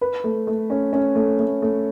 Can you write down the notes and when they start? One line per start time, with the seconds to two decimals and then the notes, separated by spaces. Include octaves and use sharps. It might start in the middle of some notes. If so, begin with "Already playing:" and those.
0.01 B4
0.24 A3
0.47 A3
0.70 C#4
0.93 C#4
1.15 A3
1.39 A3
1.62 A3